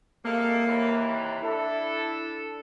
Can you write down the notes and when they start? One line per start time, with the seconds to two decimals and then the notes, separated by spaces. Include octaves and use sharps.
0.24 C2 G#3 A#3 A4
0.65 D#2 C3 E3
1.42 D4 E4 A4